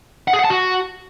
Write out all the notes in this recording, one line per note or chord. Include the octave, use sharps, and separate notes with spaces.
F#5
G#4
F#5
A5
F#4